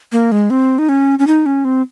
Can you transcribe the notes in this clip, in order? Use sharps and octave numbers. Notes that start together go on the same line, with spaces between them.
A#3
G#3
C4
D#4
C#4
C#4
D#4
C#4
C4